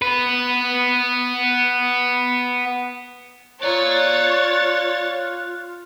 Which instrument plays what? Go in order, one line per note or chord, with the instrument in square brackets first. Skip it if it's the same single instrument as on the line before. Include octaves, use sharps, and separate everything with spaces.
[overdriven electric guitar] B3 B4
[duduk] F4 [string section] C#5 A6 [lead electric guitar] D5 A#5 [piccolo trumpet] F#6